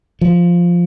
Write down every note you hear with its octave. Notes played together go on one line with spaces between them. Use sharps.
F3